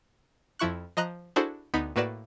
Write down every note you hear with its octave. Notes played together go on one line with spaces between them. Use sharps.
F2 F3 E4 C#6 F#6
F3 D#5 A#5 F#6
D4 E4 F#4 G#4 A4 C5
D2 B3 D#4 B5
A2 A#3 F#4 B4 D5 E7